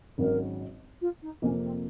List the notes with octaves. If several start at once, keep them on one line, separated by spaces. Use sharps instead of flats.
G#1 G#2 F#3 C#4 F#4 A#4
F4
D#4
F2 C3 F3 A#3 C#4
C4